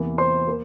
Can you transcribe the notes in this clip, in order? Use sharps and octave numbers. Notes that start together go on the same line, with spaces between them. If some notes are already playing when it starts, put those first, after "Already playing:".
Already playing: E2 C3 E3 A#3
C5 C6
A#3